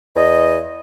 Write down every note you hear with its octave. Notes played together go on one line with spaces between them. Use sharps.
E2 D#5